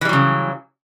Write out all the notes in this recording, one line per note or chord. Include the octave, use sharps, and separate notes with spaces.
C#3 E3 F#3 G3